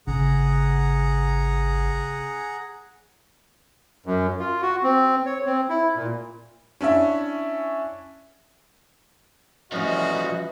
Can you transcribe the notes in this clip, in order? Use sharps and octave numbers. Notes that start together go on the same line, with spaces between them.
G#1 C#3 G#4 F#5 A#5
F#2
F4
F#4
C4
C#5
C4
E4
A#2
C#4 D4 E4 E5
E3 F3 G3 C#4 F#4 D#5